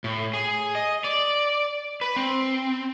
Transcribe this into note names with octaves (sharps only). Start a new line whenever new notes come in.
A2
G#4
D#5
D5
B4
C4